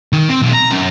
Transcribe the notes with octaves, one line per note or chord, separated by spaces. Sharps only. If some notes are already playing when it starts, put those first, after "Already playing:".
D#3
C4
B1
A#5
F#2